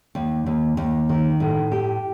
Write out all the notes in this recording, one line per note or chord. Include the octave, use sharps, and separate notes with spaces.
D#2
D#2
D#2
D#3
A2
G4